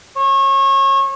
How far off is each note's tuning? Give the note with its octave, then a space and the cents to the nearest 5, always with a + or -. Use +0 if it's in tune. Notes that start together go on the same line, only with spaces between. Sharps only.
C#5 -30